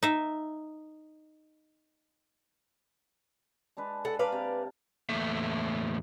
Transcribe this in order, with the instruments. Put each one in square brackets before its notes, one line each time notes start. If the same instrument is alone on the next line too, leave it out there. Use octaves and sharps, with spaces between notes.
[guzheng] D#4 E5
[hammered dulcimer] G#3 D4 B4
[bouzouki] A4 F#5
[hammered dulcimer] A#4 A5 [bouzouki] B4 D5 F5
[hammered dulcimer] C3
[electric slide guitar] E2 A2 A3 A#3 E5